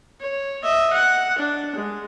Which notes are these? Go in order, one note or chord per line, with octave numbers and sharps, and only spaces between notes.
C#5
D#5 E5
F#5
D4
G#3